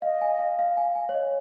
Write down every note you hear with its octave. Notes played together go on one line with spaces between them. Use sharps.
D#5 F5
G#5
F5
F5
G#5
G#5
C#5
D#5